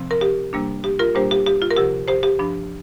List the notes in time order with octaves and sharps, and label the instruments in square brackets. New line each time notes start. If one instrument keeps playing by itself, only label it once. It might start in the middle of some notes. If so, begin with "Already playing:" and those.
Already playing: [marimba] C3 F3 C4
A#4
G4
C3 G3 A#3 D4
G4
F4 A#4
A#2 G3 A#3 D4 G4 C5
G4
G4
F4
A#4
D2 C3 F3 G4
G4 C5
G4
G2 F3 D4